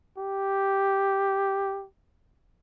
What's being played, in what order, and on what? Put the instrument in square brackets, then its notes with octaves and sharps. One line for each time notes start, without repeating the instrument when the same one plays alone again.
[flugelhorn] G4